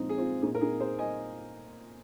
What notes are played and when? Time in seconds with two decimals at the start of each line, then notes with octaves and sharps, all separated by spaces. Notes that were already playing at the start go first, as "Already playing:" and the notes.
Already playing: A#2 F3 G#3 C4 D#4
0.09 G#4
0.17 C4 F4
0.42 A#2 D#4 G#4
0.46 A#3
0.55 A#4
0.61 D#4 G#4
0.80 G#4 C5
0.99 D#5 G#5